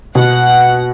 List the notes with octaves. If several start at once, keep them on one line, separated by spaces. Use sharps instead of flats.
B2 F#5